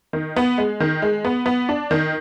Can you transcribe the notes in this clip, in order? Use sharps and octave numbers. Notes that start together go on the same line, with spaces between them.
D#3
B3
G#3
D#3
G#3
B3
B3
D4
D#3